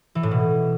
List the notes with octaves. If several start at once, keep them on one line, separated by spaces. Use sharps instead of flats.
E3
A2
B2